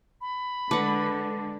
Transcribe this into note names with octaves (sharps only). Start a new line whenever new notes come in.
B5
D3 G#3 B4 F#5 A5 D6